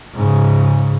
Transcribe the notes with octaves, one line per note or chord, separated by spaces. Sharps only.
G#2 C#3